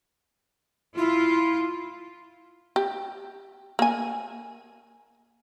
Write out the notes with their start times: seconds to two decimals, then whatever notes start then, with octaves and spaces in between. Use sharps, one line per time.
0.98 E4 F4
2.76 G4
3.79 A#3 G#5